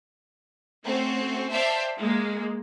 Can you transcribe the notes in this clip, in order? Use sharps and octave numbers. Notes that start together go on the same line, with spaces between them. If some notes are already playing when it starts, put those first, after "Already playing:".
A3 C4 C#4 F#4
C5 D5 E5 F5 G5 A5
G#3 A#3